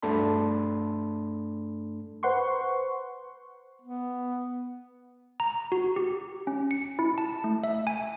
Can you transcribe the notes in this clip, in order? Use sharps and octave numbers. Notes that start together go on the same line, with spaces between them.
G2 A3 D4 A4 B5 C6
B4 C5 F#5 C6 C#6
B3
A#5
F#4
G4
C#4
C#7
E4
A5
A3
E5
G#5